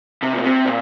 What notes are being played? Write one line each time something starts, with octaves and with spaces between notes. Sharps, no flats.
C3
A#2
C3
A#2